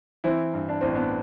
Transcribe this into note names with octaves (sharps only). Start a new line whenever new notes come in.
E3 C4 E4
G2
D4
A1 C4
B3 D4